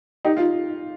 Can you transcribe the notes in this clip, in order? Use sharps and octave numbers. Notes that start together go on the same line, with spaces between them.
D#4 G4
F4